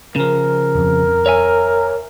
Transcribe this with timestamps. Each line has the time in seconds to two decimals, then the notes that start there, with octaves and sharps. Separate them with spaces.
0.16 C#3 F3 A#4
0.75 D#1 F2
1.26 C#5 E5 G#5